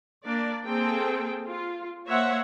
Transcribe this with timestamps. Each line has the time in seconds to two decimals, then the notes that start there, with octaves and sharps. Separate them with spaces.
0.25 A#3 D4 D5
0.65 A#3 C4 G#4 A4 G5
1.46 F4
2.06 A#3 C5 C#5 E5 F#5